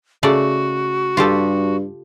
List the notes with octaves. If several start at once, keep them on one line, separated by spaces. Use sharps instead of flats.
C#3 A3 F#4 D5
G2 F4 G4 A4